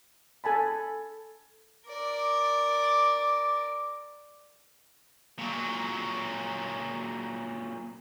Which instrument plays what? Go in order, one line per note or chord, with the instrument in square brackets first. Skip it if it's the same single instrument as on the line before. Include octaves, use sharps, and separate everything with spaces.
[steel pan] A4 G#5 A5 B5
[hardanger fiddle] A#4 D5 [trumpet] D6
[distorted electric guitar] A#2 F#3